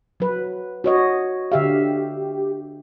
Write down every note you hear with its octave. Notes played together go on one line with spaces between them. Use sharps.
F#3 B4
F#4 C#5 D#5
D3 G4 E5 F5